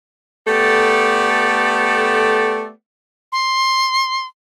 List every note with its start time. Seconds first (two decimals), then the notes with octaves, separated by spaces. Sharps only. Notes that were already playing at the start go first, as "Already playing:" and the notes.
0.47 A3 B3 G4 A4 D5
3.32 C6